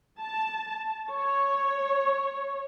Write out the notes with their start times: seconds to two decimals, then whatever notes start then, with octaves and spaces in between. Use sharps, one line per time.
0.19 A5
1.10 C#5